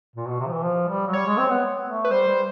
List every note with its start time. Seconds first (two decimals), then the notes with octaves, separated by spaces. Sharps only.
0.16 A#2
0.29 B2
0.40 C3
0.47 F3
0.53 E3
0.65 F3
0.89 G3
1.07 F#3
1.13 G3 C#5
1.26 G#3
1.38 C4
1.50 B3
1.86 A3
2.05 B4
2.11 G3 C5
2.27 G3